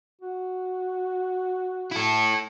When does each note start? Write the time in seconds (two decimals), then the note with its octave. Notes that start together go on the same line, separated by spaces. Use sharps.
0.22 F#4
1.91 E4 A4